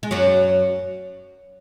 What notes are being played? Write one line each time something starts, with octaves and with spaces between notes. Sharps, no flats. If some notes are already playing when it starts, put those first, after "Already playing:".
G#3
F#2 F#3